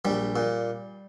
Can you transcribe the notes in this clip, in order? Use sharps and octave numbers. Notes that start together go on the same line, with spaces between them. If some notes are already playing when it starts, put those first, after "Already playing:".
A#1 G3
A#2